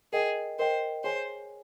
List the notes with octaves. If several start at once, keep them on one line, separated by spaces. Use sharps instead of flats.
G#4 A#4 D#5 G5
A#4 C5 D#5 G5
G#4 C5 C#5 G#5